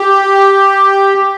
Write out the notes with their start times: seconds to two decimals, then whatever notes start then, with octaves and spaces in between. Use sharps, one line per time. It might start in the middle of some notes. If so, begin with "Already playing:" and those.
Already playing: G4